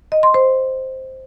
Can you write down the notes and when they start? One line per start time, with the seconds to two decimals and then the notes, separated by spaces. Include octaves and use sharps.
0.12 D#5
0.23 C6
0.34 C5